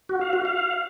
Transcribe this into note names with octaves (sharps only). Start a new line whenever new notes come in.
F#4
F5
F#4
F5